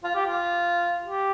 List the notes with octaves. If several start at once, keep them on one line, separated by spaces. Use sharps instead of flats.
F4
G4
F4
G4